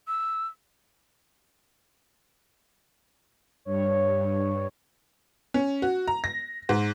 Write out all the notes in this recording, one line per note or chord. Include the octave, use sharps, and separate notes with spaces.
E6
G2 C#5
C#4
F#4
A#5
A#6
G#2